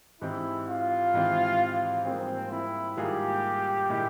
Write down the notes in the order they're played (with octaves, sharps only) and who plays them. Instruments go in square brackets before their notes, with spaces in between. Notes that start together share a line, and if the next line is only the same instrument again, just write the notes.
[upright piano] G#2 E3 G#3 C4 G4 [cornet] E4
[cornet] F4
[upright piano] G#2 E3 G#3 C4 G4
[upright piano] G#2 G3 A#3 F4 G#4 [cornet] C4
[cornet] E4
[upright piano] G#2 G3 A#3 F4 G#4 [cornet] G4
[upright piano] A#2 G#3 E4